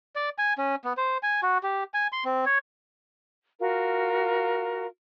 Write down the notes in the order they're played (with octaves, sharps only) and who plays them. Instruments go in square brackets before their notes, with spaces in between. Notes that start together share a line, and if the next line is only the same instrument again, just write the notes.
[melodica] D5
G#5
C#4
B3
C5
G#5
F#4
G4
G#5
C6
C4
C#5
[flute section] F4 F#4 A#4